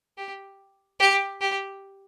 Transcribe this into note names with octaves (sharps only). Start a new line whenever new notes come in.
G4
G4
G4